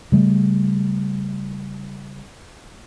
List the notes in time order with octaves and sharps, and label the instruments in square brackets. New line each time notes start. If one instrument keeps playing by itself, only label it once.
[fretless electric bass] C#3 G3 A3